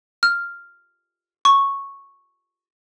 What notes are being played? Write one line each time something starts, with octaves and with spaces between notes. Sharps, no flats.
F6
C#6